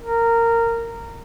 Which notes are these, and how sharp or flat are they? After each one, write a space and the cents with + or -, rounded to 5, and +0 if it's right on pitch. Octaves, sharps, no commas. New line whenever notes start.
A#4 -15